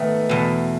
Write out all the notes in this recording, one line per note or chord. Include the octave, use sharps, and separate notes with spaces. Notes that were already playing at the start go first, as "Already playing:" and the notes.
Already playing: G#2 D#3 A3 B3
E2 B2